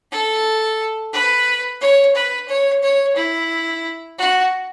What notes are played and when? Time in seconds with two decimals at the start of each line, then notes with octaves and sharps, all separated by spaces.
0.11 A4
1.13 B4
1.81 C#5
2.15 B4
2.48 C#5
2.82 C#5
3.16 E4
4.18 F#4